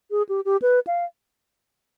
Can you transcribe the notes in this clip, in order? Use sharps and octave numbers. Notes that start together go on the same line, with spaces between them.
G#4
G4
G4
B4
F5